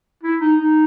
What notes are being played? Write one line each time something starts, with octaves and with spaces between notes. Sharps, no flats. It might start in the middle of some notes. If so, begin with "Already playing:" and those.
E4
D#4
D#4